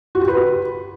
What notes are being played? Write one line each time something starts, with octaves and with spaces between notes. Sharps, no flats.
F#4
G4
B4